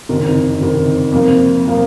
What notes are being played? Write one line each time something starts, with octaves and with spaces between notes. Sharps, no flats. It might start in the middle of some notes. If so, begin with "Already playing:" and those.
F#1 F2 C3 D#3
F#1 F2 C3 D#3
F2 C3 F3 A#3
C3 F3 A#3